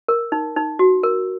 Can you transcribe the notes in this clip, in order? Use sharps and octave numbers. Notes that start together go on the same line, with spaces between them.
A#4
D#4
D#4
F#4
A#4